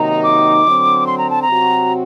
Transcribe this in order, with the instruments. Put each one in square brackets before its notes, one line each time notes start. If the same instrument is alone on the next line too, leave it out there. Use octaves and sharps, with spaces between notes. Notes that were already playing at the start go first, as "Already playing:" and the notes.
Already playing: [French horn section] C3 D#3 F#3 A#3 D#4 [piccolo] A#5
[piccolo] D6
[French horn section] D3 F#3 C4
[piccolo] C6
A#5
A5
A#5
[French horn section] C3 F#3 C4 F#4